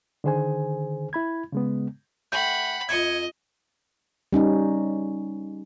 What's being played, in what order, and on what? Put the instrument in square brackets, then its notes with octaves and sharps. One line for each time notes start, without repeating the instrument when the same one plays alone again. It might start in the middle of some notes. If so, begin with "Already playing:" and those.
[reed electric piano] D3 D#3 G#4 C5 G#5
E4 B5 G#6
C#3 G#3 B3
[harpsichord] A3 [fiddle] F#5 B5 [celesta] G5 G6
[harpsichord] F2 E5 [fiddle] D#5 [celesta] G#6 C#7
[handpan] G3 C#4 D#4